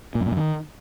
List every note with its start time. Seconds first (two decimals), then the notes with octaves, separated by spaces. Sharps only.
0.15 A#2
0.21 F#2
0.26 A#2
0.31 F#2
0.37 D#3